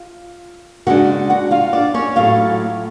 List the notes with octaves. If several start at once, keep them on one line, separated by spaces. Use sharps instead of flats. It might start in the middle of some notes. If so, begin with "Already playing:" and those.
Already playing: F4
C#3 G#3 D4 F#4 F#5
F#4 F#5
F4 F5
D4 D5
C#4 C#5
A2 F#3 A3 F4 F5